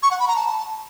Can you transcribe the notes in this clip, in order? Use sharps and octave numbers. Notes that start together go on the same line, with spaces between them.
C#6
F#5
B5
A#5
A5